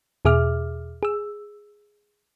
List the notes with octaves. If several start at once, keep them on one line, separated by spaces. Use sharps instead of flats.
E2 B2 G#4 E5 D6 F6
G#4 E6